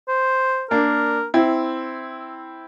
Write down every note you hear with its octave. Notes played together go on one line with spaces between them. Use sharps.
C5
A#3 D4 A#4
C4 E4